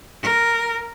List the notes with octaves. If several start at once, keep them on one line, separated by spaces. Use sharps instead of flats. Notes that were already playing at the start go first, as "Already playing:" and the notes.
A#4